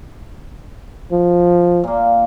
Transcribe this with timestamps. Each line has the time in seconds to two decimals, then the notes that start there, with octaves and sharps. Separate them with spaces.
1.12 F3
1.84 A#2 A#3